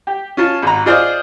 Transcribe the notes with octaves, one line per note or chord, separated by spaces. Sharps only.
G4
C#4 F4 A5
G#1 A#5
F4 G#4 C5 D5 D#5 F5